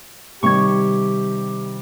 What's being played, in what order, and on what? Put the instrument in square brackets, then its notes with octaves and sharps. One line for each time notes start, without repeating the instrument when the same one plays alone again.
[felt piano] C3 D#3 G3 [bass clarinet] G4 [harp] C#6 G#6